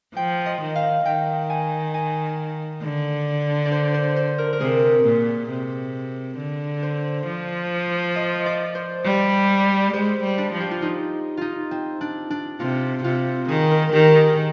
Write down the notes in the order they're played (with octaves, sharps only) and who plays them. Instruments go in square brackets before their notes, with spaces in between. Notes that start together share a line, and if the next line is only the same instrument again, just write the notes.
[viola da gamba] F3 [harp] G5
[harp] D#5
[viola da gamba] D#3
[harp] F5
[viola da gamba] D#3 [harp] G5
[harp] G#5
G#5
[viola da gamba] D3
[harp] D5
C5
C5
C5
A#4
A#4
[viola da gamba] C3 [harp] G#4
[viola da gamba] A#2
C3
D3
[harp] C5
[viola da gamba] F3
[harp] D#5
D5
C5
[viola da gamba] G3
[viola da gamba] G#3 [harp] C5
[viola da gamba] G3
[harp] D4
[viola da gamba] F3
[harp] G4
F4
D#4
D#4 F4
C4
D4
D4
[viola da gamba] C3 [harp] F4
[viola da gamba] C3 [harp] F4
[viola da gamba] D#3 [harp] G#4
[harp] A#4
[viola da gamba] D#3 [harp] G4
[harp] G#4